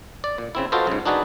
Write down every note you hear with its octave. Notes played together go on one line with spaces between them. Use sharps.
D5
A#2
C#3 C4 E4
F4 F#4 A4 B4 C5 D#5
G#2 C#3
D4 D#4 F#4 G#4 B4 D5